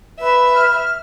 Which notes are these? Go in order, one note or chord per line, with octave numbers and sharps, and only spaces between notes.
B4 E5
F6